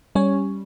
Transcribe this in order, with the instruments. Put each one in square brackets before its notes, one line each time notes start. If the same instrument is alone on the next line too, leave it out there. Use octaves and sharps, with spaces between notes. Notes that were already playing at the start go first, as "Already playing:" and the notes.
[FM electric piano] G3 C#4 C#5